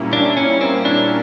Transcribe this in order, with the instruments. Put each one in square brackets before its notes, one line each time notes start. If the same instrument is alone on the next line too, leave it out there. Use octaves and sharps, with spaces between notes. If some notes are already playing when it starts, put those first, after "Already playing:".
Already playing: [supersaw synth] A#2 G3 A#3 C#4 E4
[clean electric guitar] D4
C#4
C4
D4